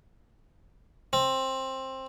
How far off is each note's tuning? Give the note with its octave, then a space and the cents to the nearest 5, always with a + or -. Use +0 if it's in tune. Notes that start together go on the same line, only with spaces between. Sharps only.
C4 +15